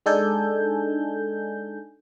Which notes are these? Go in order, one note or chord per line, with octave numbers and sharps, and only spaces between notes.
G#3 D4 D#4 A4 G#5 G6